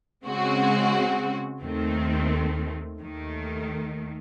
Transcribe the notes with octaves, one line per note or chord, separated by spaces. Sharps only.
C#3 G#3 C4 F#4
D#2 D#3 A3 C4
D#2 D#3 A3